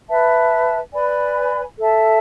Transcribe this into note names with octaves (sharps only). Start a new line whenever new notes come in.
B4 E5 A5
B4 D5 G#5 B5
A4 E5 A5